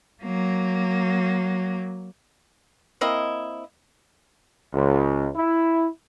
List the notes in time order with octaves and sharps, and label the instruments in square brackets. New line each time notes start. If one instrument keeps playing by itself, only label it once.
[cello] F#3 A#3
[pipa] A#3 C4 E4 D#5
[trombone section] C#2
E4